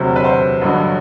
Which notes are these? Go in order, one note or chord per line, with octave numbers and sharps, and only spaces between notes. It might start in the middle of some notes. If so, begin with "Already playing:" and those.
Already playing: E1 D2 C3 F#3 C5
B4
C5
A1 G2 D3 F#3